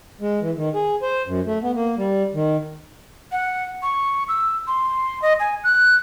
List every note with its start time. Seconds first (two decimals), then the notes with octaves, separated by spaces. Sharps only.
0.21 G#3
0.41 E3
0.56 D#3
0.74 G#4
1.02 C5
1.26 F#2
1.46 A3
1.63 B3
1.75 A#3
1.98 G3
2.34 D#3
3.32 F#5
3.83 C#6
4.29 E6
4.67 C6
5.22 D#5
5.40 G#5
5.64 F#6